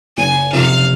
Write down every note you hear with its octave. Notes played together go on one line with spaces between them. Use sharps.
F#1 G#5
F2 C3 F5